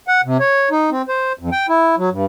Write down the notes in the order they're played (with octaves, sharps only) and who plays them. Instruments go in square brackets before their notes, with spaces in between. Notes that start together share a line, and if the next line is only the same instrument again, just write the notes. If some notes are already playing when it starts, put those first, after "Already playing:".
[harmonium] F#5
C3
C#5
D#4
C4
C5
F2
G5
E4
F#3
G2